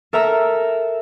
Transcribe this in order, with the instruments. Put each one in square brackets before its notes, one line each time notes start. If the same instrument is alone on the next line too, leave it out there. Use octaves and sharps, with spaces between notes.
[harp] A4 A#4 E5 A#5 E6